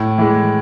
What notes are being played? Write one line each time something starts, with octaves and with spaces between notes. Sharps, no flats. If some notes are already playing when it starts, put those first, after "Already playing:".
Already playing: A2
E3 G#3